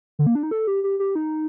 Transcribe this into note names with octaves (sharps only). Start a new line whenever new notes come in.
D3
A#3
D4
D#4
A4
G4
G4
G4
D#4